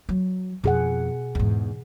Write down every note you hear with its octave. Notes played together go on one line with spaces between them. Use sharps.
F#3
F2 B2 G#4 F#5
E2 G#2